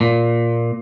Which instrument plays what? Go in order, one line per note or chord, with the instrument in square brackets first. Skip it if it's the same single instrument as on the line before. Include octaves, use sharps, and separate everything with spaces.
[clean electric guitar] A#2